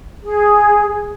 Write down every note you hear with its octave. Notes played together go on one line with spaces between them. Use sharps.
G#4